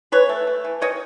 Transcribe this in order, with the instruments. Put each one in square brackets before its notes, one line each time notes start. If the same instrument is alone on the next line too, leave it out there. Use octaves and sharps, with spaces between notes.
[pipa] E3 B4 C#5
A3
A3
E3
D#3 C#5 D#5